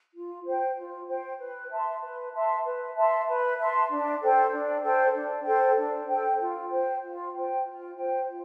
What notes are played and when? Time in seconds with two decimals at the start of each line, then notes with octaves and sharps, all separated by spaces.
0.14 F4
0.45 C5 G5
0.77 F4
1.08 C5 G5
1.39 B4
1.71 E5 A5 C6
2.02 B4
2.33 E5 A5 C6
2.64 B4
2.95 E5 A5 C6
3.27 B4
3.58 E5 A5 C6
3.90 D4
4.21 A4 C5 G5
4.52 D4
4.83 A4 C5 G5
5.14 D4
5.45 A4 C5 G5
5.78 D4
6.09 A4 C5 G5
6.39 F4
6.71 C5 G5
7.02 F4
7.34 C5 G5
7.65 F4
7.95 C5 G5
8.27 F4